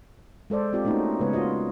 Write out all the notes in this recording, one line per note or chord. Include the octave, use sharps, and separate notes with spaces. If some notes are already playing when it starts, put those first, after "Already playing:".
G#3 A4 C5 D5
C4 F4 G4 D5
A3 A#3 C#4 D#4 F#4
C#3 G#3 B3 B4 C#5
F4 F#4 D#5